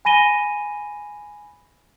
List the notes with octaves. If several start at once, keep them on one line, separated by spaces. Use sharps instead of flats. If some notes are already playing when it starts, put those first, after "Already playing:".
G#5 B5 A#6 D#7 G7